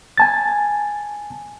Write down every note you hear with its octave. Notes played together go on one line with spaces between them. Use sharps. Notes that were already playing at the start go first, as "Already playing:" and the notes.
G#5 A5 A6